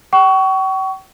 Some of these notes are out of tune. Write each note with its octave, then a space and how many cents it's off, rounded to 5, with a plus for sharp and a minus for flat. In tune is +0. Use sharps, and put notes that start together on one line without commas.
G5 -45 C#6 +20